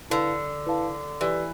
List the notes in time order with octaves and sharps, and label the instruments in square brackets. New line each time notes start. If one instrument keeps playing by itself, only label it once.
[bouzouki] D3 [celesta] E4 B4 F5 A5
[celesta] E4 B4 F5 A5
[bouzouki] E3 [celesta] G4 B4 D5